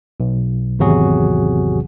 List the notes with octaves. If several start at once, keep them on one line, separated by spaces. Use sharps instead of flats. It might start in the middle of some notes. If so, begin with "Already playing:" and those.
B1
G#1 E2 C3 F#3 F#4 G#4